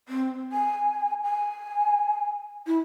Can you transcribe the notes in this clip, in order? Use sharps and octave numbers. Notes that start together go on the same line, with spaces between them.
C4
G#5
G#5
E4